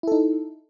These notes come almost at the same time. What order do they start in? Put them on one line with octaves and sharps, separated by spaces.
E4 A4 D#4